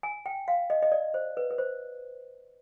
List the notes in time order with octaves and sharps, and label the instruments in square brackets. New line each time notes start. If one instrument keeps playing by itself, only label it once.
[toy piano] G#5
G5
F5
D#5
D#5
D5
C5
B4
B4
C5